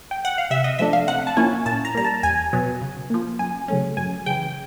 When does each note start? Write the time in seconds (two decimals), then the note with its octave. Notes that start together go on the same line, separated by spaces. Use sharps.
0.11 G5
0.25 F#5
0.38 F5
0.50 C3 E5
0.64 D#5
0.79 F3 A3 D4 E5
0.93 F5
1.08 C3 F#5
1.27 A5
1.37 F3 A#3 C#4 E4 G#5
1.66 A#2 A5
1.85 A#5
1.95 G3 A#3 A#5
2.04 A5
2.23 E2 G#5
2.53 B2 F#3 B3
2.82 C#3
3.10 F3 A#3
3.39 F#2 G#5
3.68 C#3 F#3 A3 C#4
3.97 F#2 G#5
4.26 C#3 E3 G5